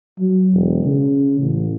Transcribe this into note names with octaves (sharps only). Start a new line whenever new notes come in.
F#3
E1
C#3
A1